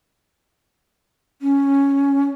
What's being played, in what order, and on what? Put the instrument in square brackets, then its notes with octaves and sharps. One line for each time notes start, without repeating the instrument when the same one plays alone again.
[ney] C#4